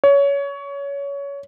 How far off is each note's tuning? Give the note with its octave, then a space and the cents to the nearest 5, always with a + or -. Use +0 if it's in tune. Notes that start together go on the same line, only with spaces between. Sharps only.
C#5 +20